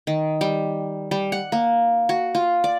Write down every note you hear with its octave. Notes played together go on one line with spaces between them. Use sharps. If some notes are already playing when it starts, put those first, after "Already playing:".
D#3
G3
G3
F#5
A#3
F#4
F4
D5